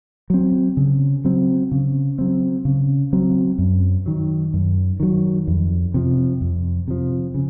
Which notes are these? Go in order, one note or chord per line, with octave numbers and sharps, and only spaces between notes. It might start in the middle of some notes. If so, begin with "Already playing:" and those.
F#3 C4
C#3
F#3 C4
C#3
F#3 C4
C#3
F#3 C4
F#2
D#3 F#3
F#2
D#3 F#3
F2
C3 F3
F2
C3 F3
C#3